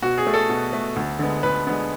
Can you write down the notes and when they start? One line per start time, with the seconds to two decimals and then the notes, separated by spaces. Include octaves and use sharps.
0.02 B2 F#4
0.18 G#4
0.27 A3
0.34 A4
0.49 B2
0.73 A3
0.96 D2
1.19 D3 G#3 B3
1.43 D2 B4
1.67 D3 G#3 B3